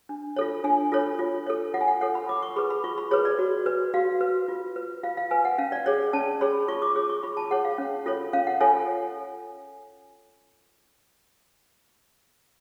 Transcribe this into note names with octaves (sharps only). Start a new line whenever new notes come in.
D4
F4 A4 C#5
D4 G#5
F4 A4 C#5
F4
A4 C#5
F4 F#5
G#5
F#5
A4 C#5 F#5
B5
F4 D6
C#6
G#4 B4 B5
B5
F4 C#6
B5
G#4 B4 C#5
D5
F#4
B4
F#4 F5
B4
F4
B4
F4 F5
F5
B4 G#5
F#5
C#4 F5
D5
G#4 C#5 D5
C#4 A5
G#4 C#5 B5
F4 C#6
D6
G#4 C#5 D6
C#6
F4 B5
A5
G#4 C#5 F#5
F5
C#4
F4 A4 C#5
C#4 F5
F#5
F4 A4 C#5 G#5